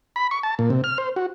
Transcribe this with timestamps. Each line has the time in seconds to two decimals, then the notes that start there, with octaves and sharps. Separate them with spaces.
0.16 B5
0.31 C#6
0.43 A5
0.59 A#2
0.70 C3
0.84 F6
0.98 C5
1.16 F#4